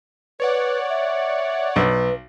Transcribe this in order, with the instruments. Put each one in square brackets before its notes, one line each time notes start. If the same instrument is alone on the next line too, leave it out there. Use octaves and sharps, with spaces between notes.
[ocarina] B4 [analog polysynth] C#5 D5 F#5
[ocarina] E5
[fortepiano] B1 [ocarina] B4